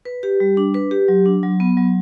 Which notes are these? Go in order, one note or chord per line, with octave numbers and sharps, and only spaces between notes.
B4
G4
G3
D4
B4
G4
F#3
D4
F#3
B3
F#3